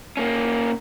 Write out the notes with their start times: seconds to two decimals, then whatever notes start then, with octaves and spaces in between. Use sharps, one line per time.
0.17 A#3 C#4